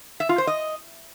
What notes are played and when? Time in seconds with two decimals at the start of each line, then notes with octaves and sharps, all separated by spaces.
0.20 E5
0.29 F4
0.38 C5
0.47 D#5